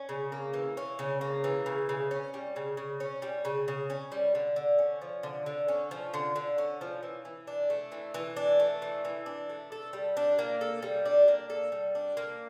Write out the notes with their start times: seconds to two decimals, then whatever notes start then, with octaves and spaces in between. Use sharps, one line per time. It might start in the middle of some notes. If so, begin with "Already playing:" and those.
Already playing: C#4
0.09 C#3
0.32 A#3
0.54 E3
0.77 C#4
0.99 C#3
1.21 A#3
1.44 E3
1.66 C#3
1.89 C#3
2.11 C#4
2.34 G3
2.56 C#3
2.77 C#3
3.00 C#4
3.22 G3
3.45 C#3
3.68 C#3
3.90 C#4
4.12 G3
4.35 D3
4.56 D3
4.79 C#4
5.02 F3
5.23 D3
5.46 D3
5.68 C#4
5.91 F3
6.14 D3
6.36 D3
6.58 C#4
6.81 F3
7.03 E3
7.25 E3
7.47 D4
7.70 A3
7.92 E3
8.14 E3
8.37 D4
8.60 A3
8.82 E3
9.05 E3
9.26 D4
9.49 A3
9.72 A4
9.93 G3
10.17 D4
10.39 A#3
10.61 A4
10.83 G3
11.05 D4
11.28 A#3
11.50 A4
11.72 G3
11.95 D4
12.17 A#3